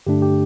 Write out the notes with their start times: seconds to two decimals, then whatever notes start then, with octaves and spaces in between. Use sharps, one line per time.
0.07 G2 D3 A3 D4 G4
0.22 G4